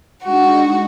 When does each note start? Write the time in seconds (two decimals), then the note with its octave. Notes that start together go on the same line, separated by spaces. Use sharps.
0.24 G#3 D4 D#4 F#4